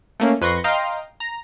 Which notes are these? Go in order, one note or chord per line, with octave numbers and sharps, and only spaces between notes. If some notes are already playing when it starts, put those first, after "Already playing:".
A3 A#3 C#4
F2 B4 C6 C#6 A#6
D#5 F5 G5 A#5 C6
A#5